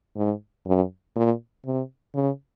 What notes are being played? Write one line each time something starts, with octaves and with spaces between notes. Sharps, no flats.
G#2
F#2
A#2
C3
C#3